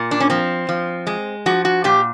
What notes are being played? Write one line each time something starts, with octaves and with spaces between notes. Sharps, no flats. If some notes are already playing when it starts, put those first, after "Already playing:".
Already playing: A#2
D4
C#4
F3 C4
F3
G#3
F3 F#4
F#4
A#2 G4